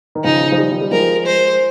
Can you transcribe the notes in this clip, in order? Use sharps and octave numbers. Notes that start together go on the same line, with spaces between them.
D#3
C#3 F3 D#4
F3
D#3 G3
F3
G3
F3 G#3 A#4
C5